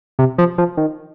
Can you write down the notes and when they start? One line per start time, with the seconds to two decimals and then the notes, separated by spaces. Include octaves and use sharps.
0.19 C3
0.38 F3
0.58 F3
0.77 D#3